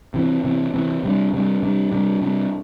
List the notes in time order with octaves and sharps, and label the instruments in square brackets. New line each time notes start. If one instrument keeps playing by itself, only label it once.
[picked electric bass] C3 E3 C4
C3 E3 C4
C3 E3 C4
C3 G3 D4
C3 G3 D4
C3 G3 D4
C3 G3 D4
C3 G3 D4